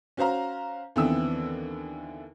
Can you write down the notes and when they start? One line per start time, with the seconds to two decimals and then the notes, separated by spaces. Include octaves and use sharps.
0.17 C#4 F#4 C5 F5 A#5
0.96 D#2 D3 E3 B3 C4 E6